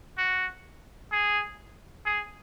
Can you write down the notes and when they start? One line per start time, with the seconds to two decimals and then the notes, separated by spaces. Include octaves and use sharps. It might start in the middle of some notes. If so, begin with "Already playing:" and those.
0.18 F#4
1.12 G#4
2.06 G#4